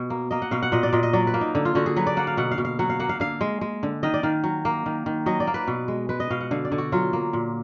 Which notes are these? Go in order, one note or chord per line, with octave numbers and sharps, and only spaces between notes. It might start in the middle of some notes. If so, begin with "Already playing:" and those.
Already playing: B2
A#3
A#3 D#5
F#5
B2 F5
F#5
A#2 D#5
D5
A#2 D#5
D#5
F#3 D5
B4
A#3
D#4
D3
F4
D3 F#4
G#4
F#3 B4
D5
A#3 F#5
F5
B2 F#5
F5
B2
F5
F#3 F#5
F5
A#3 F#5
F5
D3 F5
G#3
G#3
D3
D#3 D#5
D5
D#3 F5
F#3
A#3
D#3
D#3
F#3 D#5
D5
A#3
B4
B2
G#3
G#3 B4
D#5
B2 F5
F#5
D3 F5
D5
D3
F#4
F#3 F4
A#3
A#2